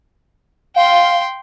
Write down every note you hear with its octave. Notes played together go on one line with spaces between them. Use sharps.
F5 G5 C6